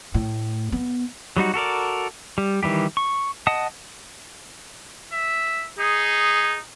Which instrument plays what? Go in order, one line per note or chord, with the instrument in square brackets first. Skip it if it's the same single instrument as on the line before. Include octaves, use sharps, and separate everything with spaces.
[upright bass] A2
B3
[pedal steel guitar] F#3 G3 D#4 F#4
F#4 A4 A#4 D5
G3
D#3 E3 G3 G4
C#6
D#5 F#5 A5 D#6
[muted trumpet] E5
[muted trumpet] D#4 [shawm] G#4